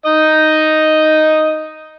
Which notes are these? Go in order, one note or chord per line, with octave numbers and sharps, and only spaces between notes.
D#4 D#5